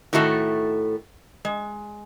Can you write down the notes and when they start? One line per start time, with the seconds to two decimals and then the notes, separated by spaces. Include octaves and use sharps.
0.13 A2 D#3 A3 F#4 A4
1.45 G#3